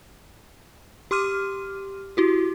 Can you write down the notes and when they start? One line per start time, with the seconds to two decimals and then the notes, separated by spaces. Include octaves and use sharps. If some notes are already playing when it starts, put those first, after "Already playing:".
1.11 G4 C6 D6 F6 D#7
2.17 E4 F#4 G4